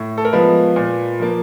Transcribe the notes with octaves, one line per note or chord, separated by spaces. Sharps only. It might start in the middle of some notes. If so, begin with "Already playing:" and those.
Already playing: A2
A4
A#4
F3 G#3 B3 B4
A#2
F3 A#3